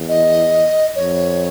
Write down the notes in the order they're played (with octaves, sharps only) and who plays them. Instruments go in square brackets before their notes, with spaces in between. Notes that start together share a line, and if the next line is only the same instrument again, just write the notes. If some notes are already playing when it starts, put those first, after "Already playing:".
Already playing: [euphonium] E2
[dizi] D#5
[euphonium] F2 [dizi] C#5